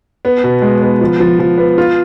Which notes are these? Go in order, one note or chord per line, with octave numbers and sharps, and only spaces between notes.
B3
B2
G#3
B3
F3
F3
F3
B3
F4